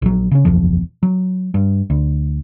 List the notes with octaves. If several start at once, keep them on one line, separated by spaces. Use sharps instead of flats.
A#1 F#3
C#3 C#4
F#1 B1 E2 F3
F#3
G2
D2